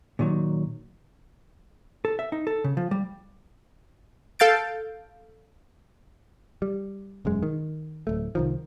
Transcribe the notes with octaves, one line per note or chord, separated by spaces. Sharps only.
A#2 D#3 F#3
A4
E5
D#4
A4
C#3
F3
G3
A4 F5 G6 A6 D7
G3
E1 F#2 G#3
D#3
D1 A3
C2 D#3 F3